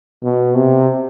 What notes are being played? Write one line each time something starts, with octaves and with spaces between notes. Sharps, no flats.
B2
C3